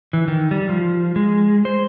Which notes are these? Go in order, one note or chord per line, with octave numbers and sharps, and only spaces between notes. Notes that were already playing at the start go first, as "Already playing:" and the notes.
E3
D#3
G3
F3
G#3
C5